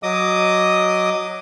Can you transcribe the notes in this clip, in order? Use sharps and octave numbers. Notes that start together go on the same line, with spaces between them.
F#3 D#5 D6 D#6